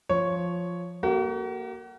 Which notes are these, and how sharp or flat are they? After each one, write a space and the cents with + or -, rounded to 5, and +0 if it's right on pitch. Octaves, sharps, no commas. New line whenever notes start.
F3 +0 C#5 +0
A#3 +0 F#4 +40 A4 +0